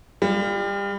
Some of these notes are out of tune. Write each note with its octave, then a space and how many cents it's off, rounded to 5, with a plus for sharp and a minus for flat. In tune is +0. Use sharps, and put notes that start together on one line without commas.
G3 +30 F4 -15